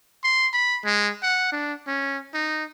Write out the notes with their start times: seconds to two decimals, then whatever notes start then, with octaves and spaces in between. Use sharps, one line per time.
0.24 C6
0.53 B5
0.85 G#3
1.23 F#5
1.52 D4
1.87 C#4
2.34 D#4